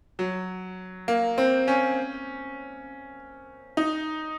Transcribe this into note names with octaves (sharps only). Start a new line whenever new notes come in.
F#3
A#3
C4
C#4
D#4